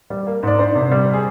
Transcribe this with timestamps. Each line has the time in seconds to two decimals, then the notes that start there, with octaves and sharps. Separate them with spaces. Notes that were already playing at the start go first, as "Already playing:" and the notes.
0.10 G3
0.27 A#3
0.43 G#2 D5
0.59 D4 C5
0.75 C3
0.91 G3
1.13 G#4